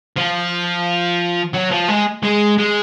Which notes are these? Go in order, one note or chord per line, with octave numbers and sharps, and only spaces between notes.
F3
F#3
F3
G#3
G#3
G#3